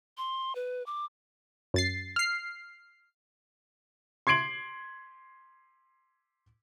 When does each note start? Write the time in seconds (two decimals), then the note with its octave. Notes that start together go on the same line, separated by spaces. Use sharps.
0.18 C6
0.55 B4
0.86 D6
1.74 F#2 A6 C7
2.16 F6 C7
4.27 C6 G#6 C7 D7 F#7